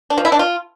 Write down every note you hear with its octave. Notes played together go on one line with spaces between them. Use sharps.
D4
F3
E4
D4
F4